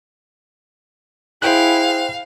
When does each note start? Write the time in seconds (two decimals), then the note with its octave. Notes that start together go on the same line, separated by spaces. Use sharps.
1.42 E4 G#4 C5 F5 G5 F#6